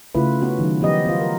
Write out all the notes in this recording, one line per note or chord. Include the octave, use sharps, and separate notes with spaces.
C#3 A3 E4 F4 B4
B3 C#4 F#4
D#3 F#3
F3 B3 G4 D#5
B3 F4
A#4